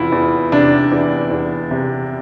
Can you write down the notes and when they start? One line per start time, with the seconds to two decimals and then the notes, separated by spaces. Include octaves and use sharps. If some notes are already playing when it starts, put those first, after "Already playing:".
Already playing: E2 C3 E4 F4
0.12 E2
0.52 C3 D4
0.92 E2
1.31 E2
1.71 C3